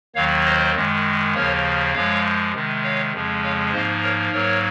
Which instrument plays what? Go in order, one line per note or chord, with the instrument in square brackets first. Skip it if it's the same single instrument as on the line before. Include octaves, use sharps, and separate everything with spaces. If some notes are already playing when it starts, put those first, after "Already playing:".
[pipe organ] D#2 D#3 F#3 A#3 C#5 F5
C5 D#5
F#2 D#3 G#3
D#2 C#3 F3 A#3 A#4 C#5
F#2 F3 G#3 C#5 F5
C3 D#3 G#3
C#5 F5
F2 C#3 F3 G#3
C#5 F5
G#2 F3 A#3 C5 D#5
A#4 C#5
G#2 F#3 A#3 A#4 C#5